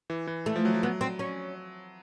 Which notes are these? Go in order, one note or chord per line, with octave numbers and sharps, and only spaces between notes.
E3
E3
A3
F3
F#3
F3
F#3 B3
C4
C#4